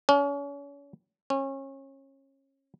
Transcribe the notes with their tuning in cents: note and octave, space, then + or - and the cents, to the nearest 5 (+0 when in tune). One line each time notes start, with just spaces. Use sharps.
C#4 +35
C#4 -30